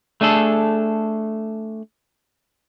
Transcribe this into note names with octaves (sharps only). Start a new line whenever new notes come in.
A3 D4 G#4 A4